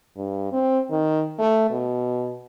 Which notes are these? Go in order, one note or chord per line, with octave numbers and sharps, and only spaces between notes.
G2
C4
D#3
A3
B2